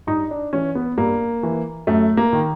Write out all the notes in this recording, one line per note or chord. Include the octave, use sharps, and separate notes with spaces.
G2 D#4
D4
E3 C#4
B3
G2 A#3
E3
F#2 A3
A#3
D#3